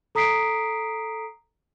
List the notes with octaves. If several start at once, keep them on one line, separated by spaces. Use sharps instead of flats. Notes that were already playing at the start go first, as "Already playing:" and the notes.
A4 A#5 D#6 B6 C7 D7